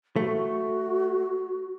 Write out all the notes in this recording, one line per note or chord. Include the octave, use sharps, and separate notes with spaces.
A3 F#4